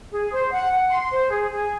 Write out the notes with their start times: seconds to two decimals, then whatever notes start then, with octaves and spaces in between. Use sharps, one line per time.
0.11 G#4
0.31 C5
0.51 F#5
0.71 F#5
0.90 C6
1.11 C5
1.30 G#4
1.50 G#4